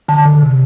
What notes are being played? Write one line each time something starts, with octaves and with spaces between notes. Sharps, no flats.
D3 A5
D3
C3